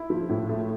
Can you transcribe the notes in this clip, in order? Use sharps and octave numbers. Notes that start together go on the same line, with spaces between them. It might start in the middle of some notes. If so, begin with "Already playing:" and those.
Already playing: E4
F3
A2
A3